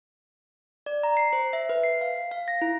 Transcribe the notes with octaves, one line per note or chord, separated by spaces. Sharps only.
D5
A#5
C7
C5
E5
B4
C7
F5
F5
A#6
E4